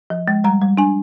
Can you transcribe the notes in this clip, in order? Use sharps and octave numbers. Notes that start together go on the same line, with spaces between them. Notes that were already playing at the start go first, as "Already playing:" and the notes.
F3
G#3
G3 A#5
G3
D4 G#5